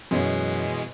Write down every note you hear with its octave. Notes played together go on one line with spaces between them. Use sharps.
F#2 B2 E3 G#3